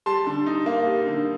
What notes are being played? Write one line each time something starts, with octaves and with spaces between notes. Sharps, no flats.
G3 A5 C6
D3
D#4
A#3
G3
D3